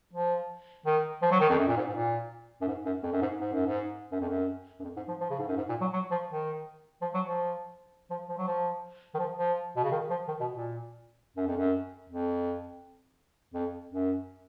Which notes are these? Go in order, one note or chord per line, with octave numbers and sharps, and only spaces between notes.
F3
D#3
F3
F#3
D#3
F2
F#2
A#2
G#2
G#2
A#2
F#2
G#2
F#2
F2
F#2
G#2
G#2
F#2
G#2
F#2
F2
F#2
F#2
F2
G#2
F3
F3
C#3
G#2
F#2
G#2
A#2
F#3
F#3
F3
D#3
F3
F#3
F3
F3
F3
F#3
F3
D#3
F3
F3
B2
C#3
D#3
F3
D#3
B2
A#2
F#2
F2
F#2
F2
F2
F#2